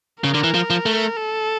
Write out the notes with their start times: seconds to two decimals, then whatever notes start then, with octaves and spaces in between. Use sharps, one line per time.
0.24 C#3 A#4
0.34 D3
0.44 E3
0.55 F3
0.70 F3
0.86 A3
1.16 A4